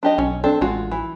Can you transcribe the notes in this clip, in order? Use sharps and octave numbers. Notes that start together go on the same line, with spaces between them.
D4 G4 D#5
B1 C#4
C4 D4 A4
A1 G#3 F4 F#4
E3